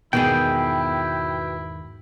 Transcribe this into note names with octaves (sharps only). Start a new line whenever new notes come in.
E2 G#2 B2 D#3 B3 E4 G#4 G5